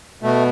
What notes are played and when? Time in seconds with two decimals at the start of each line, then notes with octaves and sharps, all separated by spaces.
0.22 B2 A3